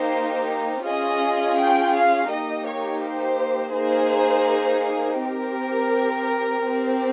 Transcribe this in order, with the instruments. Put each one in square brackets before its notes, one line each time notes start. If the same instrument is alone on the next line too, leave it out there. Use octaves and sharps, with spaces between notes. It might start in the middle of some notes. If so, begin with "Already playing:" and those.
Already playing: [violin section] A#3 D#4 G4 C5
C#4 F4 G#4 D#5
G5
F5
A#3 D#4 G4 D#5
C#5
C5
A#3 D#4 G#4 C5
C4 G4 A#4
C4 G4